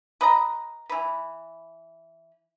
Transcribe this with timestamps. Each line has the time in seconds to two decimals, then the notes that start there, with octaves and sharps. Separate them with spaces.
0.21 B4 D#5 A#5
0.89 E3 B4